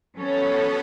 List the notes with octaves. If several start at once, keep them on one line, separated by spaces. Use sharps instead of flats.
F#3 B3 C#4 A4 C#5